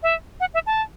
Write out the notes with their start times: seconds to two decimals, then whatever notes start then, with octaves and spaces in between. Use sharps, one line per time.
0.03 E5
0.40 F#5
0.54 E5
0.67 A5